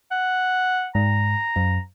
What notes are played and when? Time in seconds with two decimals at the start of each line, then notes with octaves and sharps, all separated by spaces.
0.11 F#5
0.95 G#2 A#5
1.56 F#2